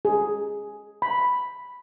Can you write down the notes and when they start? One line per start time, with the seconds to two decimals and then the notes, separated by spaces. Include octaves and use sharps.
0.05 G#4
1.02 B5